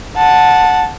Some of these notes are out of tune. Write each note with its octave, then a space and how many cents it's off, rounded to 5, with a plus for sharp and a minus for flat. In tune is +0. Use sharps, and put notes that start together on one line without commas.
F#5 -15 A5 +0